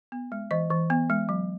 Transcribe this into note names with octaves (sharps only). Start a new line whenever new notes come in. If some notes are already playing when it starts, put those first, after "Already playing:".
B3
G#3
E3 D#5
E3
B3
G#3
F#3